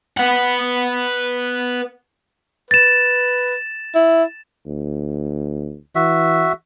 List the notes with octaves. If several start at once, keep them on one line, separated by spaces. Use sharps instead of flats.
B4 F#5
B4 A6 E7
E4
D2
E3 F#4 E5